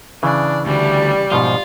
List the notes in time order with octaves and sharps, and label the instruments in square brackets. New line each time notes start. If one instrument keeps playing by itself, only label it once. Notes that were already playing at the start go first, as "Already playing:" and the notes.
[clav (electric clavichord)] C#3 E3 [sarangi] D4
[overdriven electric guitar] D2 D3 [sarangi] G3
[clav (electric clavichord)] G#2 B2 F3 [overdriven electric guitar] F4